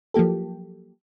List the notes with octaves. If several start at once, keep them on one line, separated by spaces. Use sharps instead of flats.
F3 F#3 A#3 G4 A4